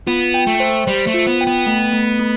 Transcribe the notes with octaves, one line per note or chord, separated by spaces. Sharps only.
B3 F4
G5
A3
C5
G3 C5
A3
F4
B3
G5
B3
A3
A3
A3